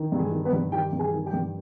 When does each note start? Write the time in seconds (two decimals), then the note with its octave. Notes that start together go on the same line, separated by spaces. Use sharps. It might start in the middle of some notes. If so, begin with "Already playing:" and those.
Already playing: D#3
0.12 G2
0.18 G#3 G#4
0.32 D#3
0.45 B3 B4
0.53 G2
0.72 D#3 G4 G5
0.93 G2
0.99 G#4 G#5
1.13 D#3
1.26 G4 G5
1.33 G2